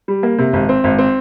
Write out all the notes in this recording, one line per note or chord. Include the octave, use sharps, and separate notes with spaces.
G3
A#3
C3
G#1
C4
G#1
C4